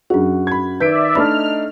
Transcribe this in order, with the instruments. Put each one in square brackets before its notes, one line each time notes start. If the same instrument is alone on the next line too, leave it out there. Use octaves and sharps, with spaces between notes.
[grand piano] F#2 F#4 [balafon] D4 G#4
[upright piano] B5 G#6
[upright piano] D#3 [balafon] B4 [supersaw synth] D5 E5 [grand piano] G6 B6 D7
[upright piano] A3 D4 D#4 [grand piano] D#5 A5 [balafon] B5 [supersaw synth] F6